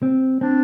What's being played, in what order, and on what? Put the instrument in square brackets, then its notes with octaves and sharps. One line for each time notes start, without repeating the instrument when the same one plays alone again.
[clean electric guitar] C4
[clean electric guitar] C4 [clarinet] D4